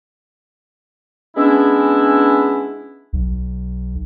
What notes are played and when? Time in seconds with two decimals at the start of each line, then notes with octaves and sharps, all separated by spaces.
1.36 G#3 B3 C#4 D4 E4
3.13 B1